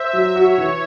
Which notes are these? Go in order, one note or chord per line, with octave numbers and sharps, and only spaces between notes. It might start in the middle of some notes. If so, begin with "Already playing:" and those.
Already playing: C5 E5
F#3
F#4 C#5
E3